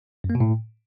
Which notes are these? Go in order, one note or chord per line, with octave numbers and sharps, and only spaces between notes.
F#2
A#3
B2
A2